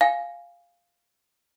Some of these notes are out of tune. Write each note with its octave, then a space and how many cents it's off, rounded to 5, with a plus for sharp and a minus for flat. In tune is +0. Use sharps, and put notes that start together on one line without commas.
F5 +0 G#5 +0